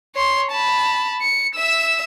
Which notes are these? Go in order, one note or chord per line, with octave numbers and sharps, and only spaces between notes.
C#5 C6
A5 B5
C#7
E5 E6